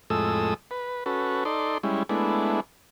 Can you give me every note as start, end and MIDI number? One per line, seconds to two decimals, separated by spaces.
0.10 0.54 41
0.10 0.54 45
0.10 0.54 56
0.10 0.54 69
0.10 0.54 87
0.10 0.54 88
0.71 1.04 71
1.06 1.44 61
1.06 1.44 66
1.06 1.44 69
1.06 1.44 71
1.45 1.78 63
1.45 1.78 69
1.45 1.78 74
1.45 1.78 84
1.83 2.03 55
1.83 2.03 56
1.83 2.03 61
1.83 2.03 64
2.09 2.60 56
2.09 2.60 57
2.09 2.60 59
2.09 2.60 62
2.09 2.60 64